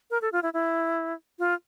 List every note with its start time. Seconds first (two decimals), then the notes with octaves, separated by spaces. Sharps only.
0.11 A#4
0.22 A4
0.32 F4
0.43 E4
0.53 E4
1.39 F4